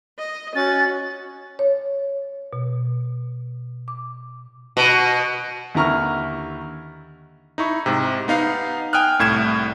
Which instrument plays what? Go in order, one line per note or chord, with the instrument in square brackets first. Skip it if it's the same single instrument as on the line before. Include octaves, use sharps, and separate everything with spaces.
[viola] D#5
[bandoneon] C#4 [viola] F#4 [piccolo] A6
[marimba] C#5
B2
D6
[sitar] B2
[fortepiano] D#2 D3 E4 A#5 C#6 F6
[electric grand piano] D#4 E4 C#6
G#2 C3
B3 D#4 F5 C7
G5 G#5 D#6 F6 F#6
C2 A2 G#6 E7